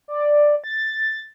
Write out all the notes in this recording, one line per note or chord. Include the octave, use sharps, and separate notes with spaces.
D5
A6